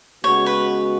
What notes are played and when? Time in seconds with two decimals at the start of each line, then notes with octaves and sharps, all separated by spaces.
0.24 C#3 G#3 B3 F#4 C#5
0.46 B4